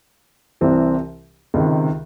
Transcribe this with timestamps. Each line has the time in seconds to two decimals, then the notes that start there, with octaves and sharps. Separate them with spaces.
0.61 C2 C3 E3 C4
1.54 C#2 C3 D#3